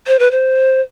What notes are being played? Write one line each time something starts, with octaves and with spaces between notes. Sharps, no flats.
C5
B4
C5